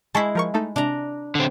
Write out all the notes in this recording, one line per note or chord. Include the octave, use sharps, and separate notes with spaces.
G#3 E4 A5 C#6 B6
F3 A#4 C#6
A3 D#4 A4
C3 D4 A#5
D3 C4